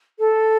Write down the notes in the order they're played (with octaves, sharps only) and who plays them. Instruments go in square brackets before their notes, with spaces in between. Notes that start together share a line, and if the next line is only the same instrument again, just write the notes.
[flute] A4